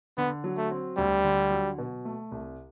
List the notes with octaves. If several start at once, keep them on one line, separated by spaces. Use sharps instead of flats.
D3 B3
F#3
A3
C4
D2 G3
D3
F#3
B2
A3
C2